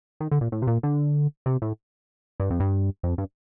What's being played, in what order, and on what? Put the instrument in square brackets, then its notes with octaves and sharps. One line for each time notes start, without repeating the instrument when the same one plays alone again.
[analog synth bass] D#3
D3
A#2
A2
C3
A#2
D3
C3
A2
G2
F2
G2
F2
G2